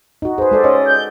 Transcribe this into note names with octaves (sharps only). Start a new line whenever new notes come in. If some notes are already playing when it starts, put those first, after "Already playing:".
D#4 F#4
G#4 B4 C5
G#3 A4 D5
C#4 D#5
G6